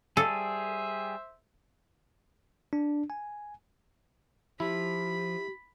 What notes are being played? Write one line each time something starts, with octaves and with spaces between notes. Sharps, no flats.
G3 G#4 A4 C5 E5
D4
G#5
F3 E4 G4 B5